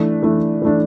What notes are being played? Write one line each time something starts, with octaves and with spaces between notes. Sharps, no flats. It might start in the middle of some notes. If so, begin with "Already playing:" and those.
Already playing: E3 A3 D4
E3 A3 D4
E3 A3 D4